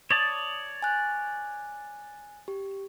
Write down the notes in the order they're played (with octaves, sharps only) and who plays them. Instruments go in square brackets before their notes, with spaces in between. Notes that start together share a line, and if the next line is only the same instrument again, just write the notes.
[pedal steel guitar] C#5 D5 A5 [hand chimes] D#6
[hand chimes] G#5 F#6
G4